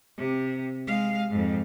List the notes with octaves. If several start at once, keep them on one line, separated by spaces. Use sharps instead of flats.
C3
G#3 F5
F2 G#2